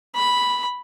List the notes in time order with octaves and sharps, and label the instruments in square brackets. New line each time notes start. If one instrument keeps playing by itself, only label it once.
[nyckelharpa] B5